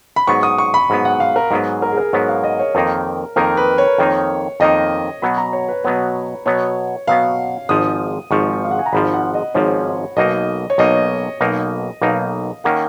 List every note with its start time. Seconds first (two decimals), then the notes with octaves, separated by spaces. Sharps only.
0.16 B5
0.27 G#2 F#3 B3 C#6
0.43 D#6
0.58 C#6
0.74 B5
0.90 G#2 F#3 B3
1.05 F#5
1.20 F5
1.36 A#4
1.51 G#2 F#3 B3 G#4
1.82 A#4
1.92 G#4
1.98 A#4
2.13 G#2 F#3 B3 C#5
2.28 F5
2.44 D#5
2.59 C#5
2.75 F2 D#3 A#3 D#4 A#4
3.36 F2 D#3 A#3 D#4 A#4
3.57 B4
3.78 C#5
3.98 F2 D#3 A#3 D#4
4.60 F2 D#3 A#3 D#4 D#5
5.22 B2 F#3 B3 B5
5.37 A#5
5.53 C#5
5.68 B4
5.84 B2 F#3 B3 C#5
6.46 B2 F#3 B3 C#5
7.07 B2 F#3 B3 F5
7.69 G#1 G#2 F3 D#6
8.31 G#1 G#2 F3 C#6
8.65 F5
8.71 F#5
8.79 G#5
8.86 A#5
8.93 G#1 G#2 F3 B5
9.14 F#5
9.34 D#5
9.54 G#1 G#2 F3 C#5
10.17 B1 B2 A#3 D#4 D#5
10.70 C#5
10.78 B1 B2 A#3 D#4 D#5
11.41 B1 B2 A#3 D#4
12.02 B1 B2 A#3 D#4 F5
12.64 D#3 A#3 C#4 F#5